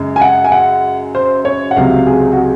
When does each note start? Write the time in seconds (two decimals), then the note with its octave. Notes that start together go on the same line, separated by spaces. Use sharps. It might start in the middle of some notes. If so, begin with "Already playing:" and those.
Already playing: F#2 C#3 G#3
0.16 G#5
0.21 F#5
0.44 G#5
0.52 F#5
1.15 C5
1.45 C#5
1.71 F#5
1.76 C#2 C3 F#3 F5
2.07 G#4
2.33 F#4
2.38 G#4